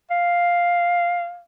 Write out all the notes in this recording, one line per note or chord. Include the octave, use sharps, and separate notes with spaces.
F5